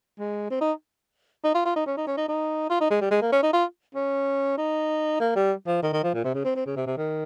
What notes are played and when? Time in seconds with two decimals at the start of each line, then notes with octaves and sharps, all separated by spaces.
0.19 G#3
0.50 C4
0.61 D#4
1.44 D#4
1.54 F4
1.65 F4
1.76 D#4
1.86 C#4
1.97 D#4
2.07 C#4
2.17 D#4
2.28 D#4
2.70 F4
2.80 D#4
2.90 G#3
3.01 G3
3.11 G#3
3.22 A#3
3.32 C#4
3.43 D#4
3.53 F4
3.95 C#4
4.57 D#4
5.20 A#3
5.36 G3
5.67 F3
5.83 D#3
5.93 D#3
6.03 F3
6.14 A#2
6.24 C3
6.34 C#3
6.45 C4
6.55 C4
6.66 C#3
6.76 C3
6.87 C3
6.97 D#3